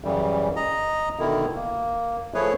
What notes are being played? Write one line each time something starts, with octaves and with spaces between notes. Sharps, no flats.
F#2 C#3 E3 G3
D#5 A#5
B2 D3 D#3 E4
A#3
F3 A3 E4 G#4 B4 C#5